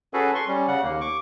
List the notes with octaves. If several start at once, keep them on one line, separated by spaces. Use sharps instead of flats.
C#4 F#4 G#4 A4 B4
C6 C#6
G3 C#4
C#3 F#5
D#2 A#3
C#6 D6